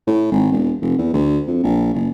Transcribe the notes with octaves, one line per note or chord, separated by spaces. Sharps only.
A2
G#1
E1
F1
E2
D2
F2
A#1
F#1